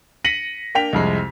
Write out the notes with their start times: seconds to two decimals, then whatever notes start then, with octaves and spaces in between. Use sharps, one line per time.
0.25 A#6 B6 C#7 D#7 F#7
0.75 A#3 D4 G5 B6 F7
0.93 C2 F2 G#3